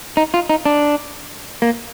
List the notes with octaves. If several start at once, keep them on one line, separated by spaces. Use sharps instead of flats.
D#4
F4
D#4
D4
A#3